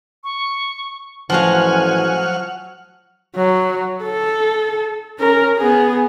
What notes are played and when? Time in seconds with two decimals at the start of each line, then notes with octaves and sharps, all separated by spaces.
0.24 C#6
1.30 A1 F3 F#3 F#4 F5 F#5 G#5 F6
3.36 F#3
4.04 A4
5.19 C#4 A#4
5.57 B3 G#4